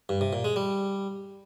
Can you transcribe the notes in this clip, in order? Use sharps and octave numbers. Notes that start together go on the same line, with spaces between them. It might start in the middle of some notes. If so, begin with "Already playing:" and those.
G2
C3
A#2
G#3
G3